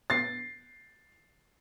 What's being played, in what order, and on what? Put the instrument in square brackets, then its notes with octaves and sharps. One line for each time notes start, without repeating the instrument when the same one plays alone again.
[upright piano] A6 C7